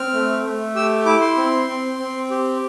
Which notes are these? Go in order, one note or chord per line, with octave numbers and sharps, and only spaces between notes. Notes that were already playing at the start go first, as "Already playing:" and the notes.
Already playing: C4 F6
A3
A3
G4 E6
E4 D6
C6
C4
C4
C4
G4